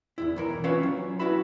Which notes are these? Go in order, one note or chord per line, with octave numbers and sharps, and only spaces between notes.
E2 G#2 E4
B1 E3 A#4
C#4 F4 B4 C#5 E5 F5
F#3
C#4 E4 F#4 B4 E5 B5